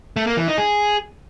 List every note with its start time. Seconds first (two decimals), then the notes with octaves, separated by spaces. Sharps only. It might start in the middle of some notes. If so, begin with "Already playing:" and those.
0.16 A3
0.27 A#3
0.37 E3
0.47 D#4
0.58 G#4